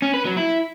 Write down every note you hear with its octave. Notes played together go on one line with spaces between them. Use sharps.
C#4
B4
F#3
E4